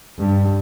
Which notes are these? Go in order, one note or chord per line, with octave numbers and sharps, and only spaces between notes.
G2